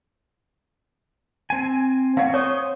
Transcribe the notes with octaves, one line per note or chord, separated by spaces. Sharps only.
C4 G#5
C4 C#5 F5 F#5
C5 C#5 C#6 D#6